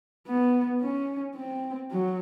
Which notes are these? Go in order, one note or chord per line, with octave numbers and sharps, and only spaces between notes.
B3
C#4
C4
F#3